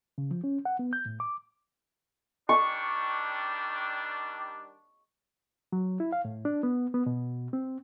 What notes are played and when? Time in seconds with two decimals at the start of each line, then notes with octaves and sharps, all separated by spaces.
0.18 C#3
0.31 F3
0.44 C#4
0.65 F#5
0.79 B3
0.93 G6
1.06 A2
1.20 D6
2.49 D#3 G3 D4 C#6
5.72 F#3
6.00 E4
6.12 F5
6.25 A2
6.45 D4
6.63 B3
6.94 B3
7.06 B2
7.53 C4